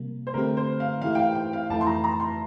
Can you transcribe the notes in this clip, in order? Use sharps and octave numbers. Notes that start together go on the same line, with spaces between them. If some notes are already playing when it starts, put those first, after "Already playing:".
Already playing: C3 G3 A#3
C5
D3 A3 C4 G4 A#4
C5
F5
E3 A3 E4 G4 F5
G5
F5
G5
F5
F2 E3 A3 E4 A5
C6
A#5
A#5
C6